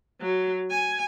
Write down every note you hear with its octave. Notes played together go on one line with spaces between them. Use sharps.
F#3
G#5